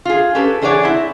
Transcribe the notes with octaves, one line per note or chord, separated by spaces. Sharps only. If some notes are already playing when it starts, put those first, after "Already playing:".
F4 G#4
C#4 G4 A4 B4
E2 D4 G#4 C#5 D5 F#5
C4 E4